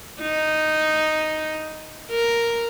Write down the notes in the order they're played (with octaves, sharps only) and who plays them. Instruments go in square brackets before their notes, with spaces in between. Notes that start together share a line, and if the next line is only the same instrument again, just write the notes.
[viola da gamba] D#4
A#4